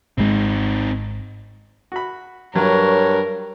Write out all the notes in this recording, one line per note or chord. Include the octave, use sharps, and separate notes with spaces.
G#1 G#3 C4 D#4
F#4 B5
G2 F#3 A#4 C#5